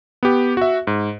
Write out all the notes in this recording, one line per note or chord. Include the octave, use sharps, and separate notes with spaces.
B3 G4
F#4 E5
G#2